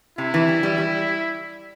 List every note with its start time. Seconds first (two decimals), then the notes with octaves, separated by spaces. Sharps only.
0.18 C3 E4
0.34 E3
0.48 G3
0.63 G3
0.78 G3